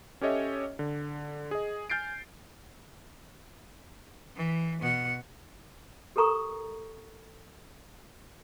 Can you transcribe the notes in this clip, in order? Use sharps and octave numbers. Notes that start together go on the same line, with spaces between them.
C#4 G4 A4 C#5 D#5 E5
D3
G#4 D#5
G#5 F6 G6 A6 C7 D7
E3
B2 F#5
G4 A4 A#4 A#5 C#6 D#6